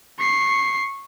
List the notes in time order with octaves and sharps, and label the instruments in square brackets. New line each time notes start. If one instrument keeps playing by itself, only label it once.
[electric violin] C#6 C7